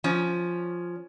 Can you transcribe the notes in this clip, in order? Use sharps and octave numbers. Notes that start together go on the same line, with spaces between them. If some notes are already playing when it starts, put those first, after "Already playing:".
F3 C#4